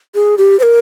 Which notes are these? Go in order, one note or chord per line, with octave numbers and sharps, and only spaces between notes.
G#4
G4
C5
A#4